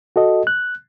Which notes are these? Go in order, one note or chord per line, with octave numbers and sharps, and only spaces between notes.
F#4 A4 D#5
F#6